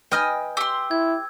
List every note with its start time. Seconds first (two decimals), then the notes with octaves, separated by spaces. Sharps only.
0.12 B4 D#5 G5 G#5 D#6 F6
0.57 G4 C6 E6
0.91 E4 G#6